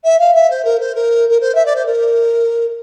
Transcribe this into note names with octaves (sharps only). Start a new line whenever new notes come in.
E5
F5
E5
C5
A#4
C5
A#4
A#4
C5
E5
D5
C5
A#4